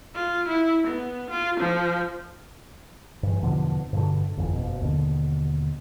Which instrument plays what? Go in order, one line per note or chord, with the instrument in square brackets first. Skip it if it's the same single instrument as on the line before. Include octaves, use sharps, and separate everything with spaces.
[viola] F4
E4
B3
F4
F3
[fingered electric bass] G2 E3
E2 B2 D3 F3
G2 B2 D3
G1 F2 E3
F#1 B2
D#2 B2 D3